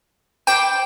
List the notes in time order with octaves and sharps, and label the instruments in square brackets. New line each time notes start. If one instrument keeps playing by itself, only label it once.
[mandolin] C5 B5 D6 [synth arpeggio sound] G5